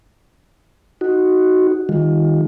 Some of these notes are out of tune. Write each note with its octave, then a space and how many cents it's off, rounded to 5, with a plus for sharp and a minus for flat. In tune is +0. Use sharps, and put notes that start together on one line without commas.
D#4 +0 F#4 +0
D#3 +0 G3 +30 F4 +25